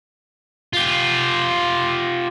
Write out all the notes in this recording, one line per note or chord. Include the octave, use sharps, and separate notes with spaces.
F4 G4